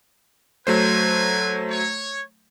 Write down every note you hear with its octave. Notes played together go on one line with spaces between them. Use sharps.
F#3 A3 B4 C5 D5 G#5
C#5